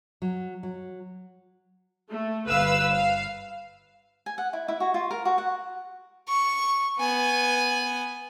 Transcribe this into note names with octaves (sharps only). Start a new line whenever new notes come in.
F#3
F#3
A3
G1 B4 F5 E6
F5
G#5
F#5
E4
E4
F#4
F4
A#4
F#4
F#5
C#6
B3 G#5